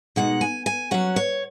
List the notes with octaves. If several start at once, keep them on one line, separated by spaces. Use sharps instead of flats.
B2 G#3 D#4 F#5
G#5
G#5
F#3 C#4 F#5
C#5